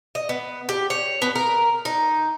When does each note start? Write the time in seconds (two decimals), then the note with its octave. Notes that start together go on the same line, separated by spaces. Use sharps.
0.15 D#5
0.29 B3
0.69 G4
0.90 C#5
1.22 B3
1.36 A#4
1.85 D#4